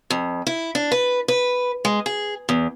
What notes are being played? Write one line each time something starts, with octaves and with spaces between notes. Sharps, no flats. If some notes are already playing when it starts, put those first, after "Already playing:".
F2
E4
D4
B4
B4
G#3
G#4
E2